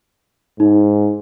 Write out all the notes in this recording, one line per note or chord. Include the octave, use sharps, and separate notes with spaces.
G#2 D#4